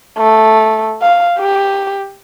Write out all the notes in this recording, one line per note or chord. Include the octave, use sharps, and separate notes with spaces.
A3
F5
G4